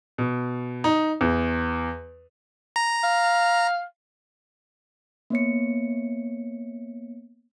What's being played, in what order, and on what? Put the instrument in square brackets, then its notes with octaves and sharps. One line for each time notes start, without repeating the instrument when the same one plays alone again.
[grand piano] B2
D#4
E2
[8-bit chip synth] A#5
[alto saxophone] F5
[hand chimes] A#3 B3 C#5 C#7